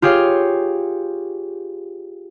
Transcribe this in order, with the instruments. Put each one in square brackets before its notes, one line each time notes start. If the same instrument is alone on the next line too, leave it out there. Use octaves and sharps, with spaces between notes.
[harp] F4 G4 G#4 C#5 F5